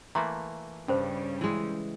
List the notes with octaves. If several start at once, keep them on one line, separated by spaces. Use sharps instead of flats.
E3 A3 A#3 A#5 C6
G2 C#3 G3 C#4 C5
E3 G#3